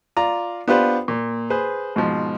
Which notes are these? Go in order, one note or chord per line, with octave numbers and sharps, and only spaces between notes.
F4 D5 A#5
B3 D4 F4 G4 B4 C5
A#2
G#4 B4 C5
G#2 B2 F3